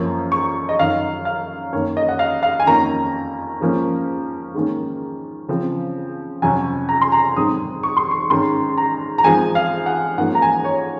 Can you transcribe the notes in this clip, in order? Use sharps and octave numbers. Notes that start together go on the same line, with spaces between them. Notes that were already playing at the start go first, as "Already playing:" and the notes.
Already playing: F#2 F3 A#3 C#4
C#6
D#5
F#2 D#3 F#3 F5
F5
F#2 D#3 A#3 C#4 C#5
D#5
F#5
F5
F5
G#5
F2 D#3 A#3 C#4 A#5
G#2 F3 A#3 C#4
G#2 D#3 A#3 C#4
C#3 F3 C4
F2 C3 F#3 C#4 G#5
A#5
C6
A#5
G#2 D#3 F#3 C4 D#6
C#6
C6
C#6
G#2 D#3 G#3 C#4 C6
A#5
A#5
G#2 F3 G#3 C4 G#5
F5
F#5
G#2 F3 A#3 C#4 F#5
A#5
G#5
C#5